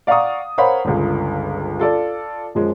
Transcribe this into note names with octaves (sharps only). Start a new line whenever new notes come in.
D5 F5 F#5 A#5 C#6 D#6
A#4 C5 C#5 F5 F#5 B5
G1 C#2
F4 A4 D5
F#2 F3 G#3